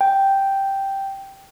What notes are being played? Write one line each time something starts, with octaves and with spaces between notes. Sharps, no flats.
G5